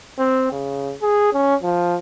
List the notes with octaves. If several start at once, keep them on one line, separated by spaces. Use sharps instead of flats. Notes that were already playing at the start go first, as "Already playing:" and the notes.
C4
C#3
G#4
C#4
F3